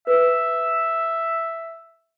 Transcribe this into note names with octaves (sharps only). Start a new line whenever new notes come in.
B4 E5